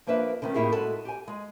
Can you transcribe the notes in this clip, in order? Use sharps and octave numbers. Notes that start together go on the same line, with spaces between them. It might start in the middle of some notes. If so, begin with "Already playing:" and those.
F3 A#3 D4 B4 E5
D3 D#3 A3 C#4
A2 A#3 E4 G4 G#4
G#3 F#4 A4
G4 G#5
G#3